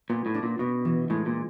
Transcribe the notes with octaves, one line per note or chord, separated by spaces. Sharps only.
A#2 B3
A2
D4
A#2
B2 B3
E3
A2 G#3
A#2